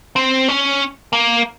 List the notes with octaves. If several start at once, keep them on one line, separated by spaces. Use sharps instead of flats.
C4
C#4
A#3